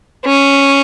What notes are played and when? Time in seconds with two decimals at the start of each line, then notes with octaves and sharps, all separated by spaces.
0.25 C#4